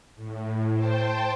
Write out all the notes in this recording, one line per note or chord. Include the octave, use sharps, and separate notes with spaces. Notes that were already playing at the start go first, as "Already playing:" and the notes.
A2
C5 G5 A5